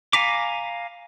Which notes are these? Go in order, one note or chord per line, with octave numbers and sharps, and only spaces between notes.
F5 G#5 A#5 B5 D6